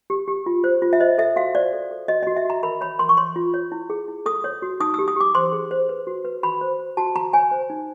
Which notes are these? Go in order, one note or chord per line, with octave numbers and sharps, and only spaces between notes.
G4
G4
F4
C5
F4
E5
C5 D#5
A4 E5
F#4 F5
C5 D5
A4
A4
F#4 D#5
F#4 D#5
E5
F#4 A#5
A#4 B5
C#5 B5
A#4 C6
C#6
C#5 C6
F4
C#5
E4
G#4
E4
A4 D#6
C#5
F#4
D#4 D#6
G4 E6
D#6
G4 D6
C5 C6
G#4
C5
B4
F#4
B4
F#4 B5
C5
C5
F#4 A5
F#4 A#5
C#5 G#5
C5
D#4